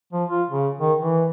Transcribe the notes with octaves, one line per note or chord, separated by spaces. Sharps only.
F3
F4
C#3
D#3
E3